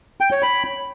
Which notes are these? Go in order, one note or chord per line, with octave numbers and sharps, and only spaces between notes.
G5
C#5
B5